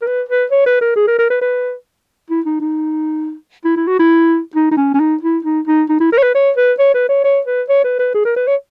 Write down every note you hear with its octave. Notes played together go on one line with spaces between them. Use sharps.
A#4
B4
B4
C#5
B4
A#4
G#4
A#4
A#4
B4
B4
E4
D#4
D#4
E4
E4
F#4
E4
D#4
D#4
C#4
C#4
D#4
E4
D#4
D#4
D#4
E4
A#4
C#5
B4
C#5
B4
C#5
B4
C#5
C#5
B4
C#5
B4
B4
G#4
A#4
B4
C#5